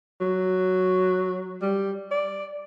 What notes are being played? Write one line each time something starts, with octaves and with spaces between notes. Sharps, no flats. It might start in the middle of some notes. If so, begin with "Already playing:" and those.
F#3
G3
D5